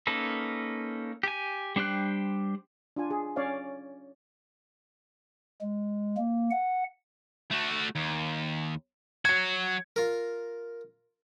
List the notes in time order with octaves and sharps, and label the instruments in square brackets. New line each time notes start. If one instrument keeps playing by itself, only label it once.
[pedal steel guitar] A#3 C#4 D#4 A4 B4
G4 G#5
G3 D4 C5 G5 F#6
[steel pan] D4 F4 G#5
G#4
C#4 C#5 D5 F5
[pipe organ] G#3
A#3
F#5
[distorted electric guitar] A3 F#4
D#2
[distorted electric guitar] F#3 F#4 [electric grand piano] G#6 C#7
[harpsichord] F4 A#4